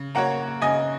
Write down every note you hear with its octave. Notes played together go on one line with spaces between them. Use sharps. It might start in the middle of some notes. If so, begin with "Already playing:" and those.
Already playing: C#3
A#3 F#4 C#5 F#5 A#5
C#3 D#5 G#5